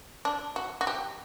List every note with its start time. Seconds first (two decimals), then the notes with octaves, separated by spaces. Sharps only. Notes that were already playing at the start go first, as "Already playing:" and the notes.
0.25 D4
0.56 F#4
0.81 F#4
0.87 G4